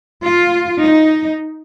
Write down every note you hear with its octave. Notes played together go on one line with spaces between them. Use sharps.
F4
D#4